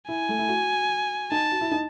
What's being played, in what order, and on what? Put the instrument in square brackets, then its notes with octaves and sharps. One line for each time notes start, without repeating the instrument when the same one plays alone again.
[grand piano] E4 [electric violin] G#5
[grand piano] A3
E4
F#4
[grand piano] D#4 [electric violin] A5
[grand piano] F#4
E4
D#4